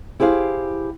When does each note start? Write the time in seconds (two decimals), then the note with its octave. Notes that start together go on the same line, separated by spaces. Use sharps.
0.20 E4 G4 G#4 C5 F5